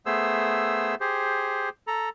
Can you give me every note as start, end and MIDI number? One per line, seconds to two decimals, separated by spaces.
0.06 0.95 57
0.06 0.95 59
0.06 0.95 68
0.06 0.95 72
0.06 0.95 88
1.01 1.69 67
1.01 1.69 68
1.01 1.69 72
1.87 2.09 69
1.87 2.09 82